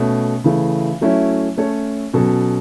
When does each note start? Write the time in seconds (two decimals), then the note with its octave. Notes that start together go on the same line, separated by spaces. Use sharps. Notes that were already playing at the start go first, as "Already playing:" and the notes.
Already playing: B2 A3 C#4
0.44 C#3 E3 A3
1.01 F#3 A3 C#4 E4
1.58 A3 C#4 A4 C#5
2.13 B2 F#3 C#4 A4